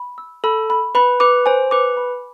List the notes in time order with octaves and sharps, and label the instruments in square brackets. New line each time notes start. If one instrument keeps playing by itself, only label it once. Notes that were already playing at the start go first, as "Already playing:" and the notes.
Already playing: [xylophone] B5
E6
[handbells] A4 [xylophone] B5
[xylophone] B5
[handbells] B4 [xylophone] B5
[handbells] B4 [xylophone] D6
[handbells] C5 [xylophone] G#5
[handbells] B4 [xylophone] D6
[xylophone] B5